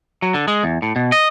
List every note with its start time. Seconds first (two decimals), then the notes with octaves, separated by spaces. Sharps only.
0.22 F#3
0.34 D3
0.48 G#3
0.64 E2
0.82 A2
0.96 B2
1.12 D#5